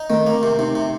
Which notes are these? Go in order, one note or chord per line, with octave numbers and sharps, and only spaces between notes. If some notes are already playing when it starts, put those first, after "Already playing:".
Already playing: D#4
D#3 A3 C4
A#3
C3
C3 C4 D#4
C3